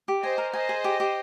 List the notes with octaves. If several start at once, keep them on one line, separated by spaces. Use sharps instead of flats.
G4
C5 D#5 G#5
A#4
C5 D#5 G#5
G#4
G4
G4